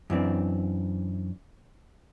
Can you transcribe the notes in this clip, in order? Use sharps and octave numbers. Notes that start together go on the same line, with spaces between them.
F#2 E3 C4 D4